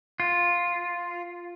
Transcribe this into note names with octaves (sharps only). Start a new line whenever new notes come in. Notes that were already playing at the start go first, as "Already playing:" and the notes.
F4